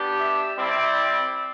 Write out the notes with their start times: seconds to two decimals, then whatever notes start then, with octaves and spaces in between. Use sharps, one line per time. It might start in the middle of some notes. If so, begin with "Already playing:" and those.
Already playing: B3 D4 G4
0.19 E5
0.57 G3 C4 E4 D5